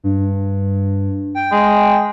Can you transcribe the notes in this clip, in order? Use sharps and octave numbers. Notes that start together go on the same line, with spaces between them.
G2
G5
G#3